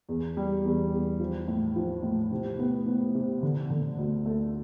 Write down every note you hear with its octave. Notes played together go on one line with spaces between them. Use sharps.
E2
G3
E2
E2
F3
A2
F3
A2
C3
B3
B3
C3
D3
D3
D2
A3